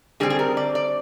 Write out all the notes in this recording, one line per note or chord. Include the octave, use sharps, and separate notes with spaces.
D3 G3 C4 G#4
G#4
A#4
D5
D5